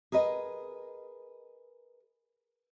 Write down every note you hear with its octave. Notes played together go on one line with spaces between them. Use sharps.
G#4 A#4 B4 D#5